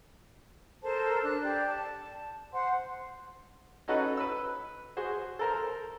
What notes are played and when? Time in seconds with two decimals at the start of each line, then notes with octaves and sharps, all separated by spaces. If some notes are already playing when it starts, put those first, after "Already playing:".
0.83 A4 A#4 C5 A5
1.23 D4 F#6
1.41 G4 D5
1.67 A5
2.53 C5 F#5 C6
3.88 C#4 D#4 F#4 A4 B4 F#5
4.17 B4 E6
4.97 F#4 G#4 C5
5.39 A4 A#4 C5